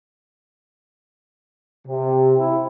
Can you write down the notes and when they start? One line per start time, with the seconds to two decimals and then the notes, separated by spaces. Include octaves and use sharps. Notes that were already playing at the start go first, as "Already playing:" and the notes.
1.87 C3
2.37 E4